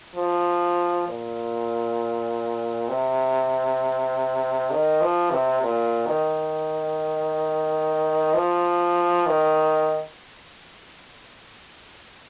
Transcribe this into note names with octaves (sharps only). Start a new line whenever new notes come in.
F3
A#2
C3
D#3
F3
C3
A#2
D#3
F3
D#3